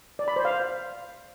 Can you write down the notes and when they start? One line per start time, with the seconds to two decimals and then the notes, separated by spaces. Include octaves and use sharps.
0.19 D5
0.28 B5
0.36 C5
0.45 F5